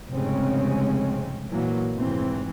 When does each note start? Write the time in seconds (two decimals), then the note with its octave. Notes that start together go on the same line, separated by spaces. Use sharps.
0.11 F1 G#2 C#3 G#3 C4 C#4
1.51 A#2 E3 F#3 A#3
1.93 F1 B1 G#2 E3 C4